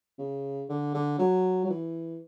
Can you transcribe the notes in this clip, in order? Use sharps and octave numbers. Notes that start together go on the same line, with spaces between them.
C#3
D3
D3
F#3
F#3
E3